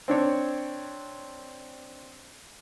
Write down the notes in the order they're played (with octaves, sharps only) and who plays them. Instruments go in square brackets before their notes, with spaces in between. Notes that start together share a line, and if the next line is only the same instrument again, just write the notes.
[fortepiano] C4 D4 C#5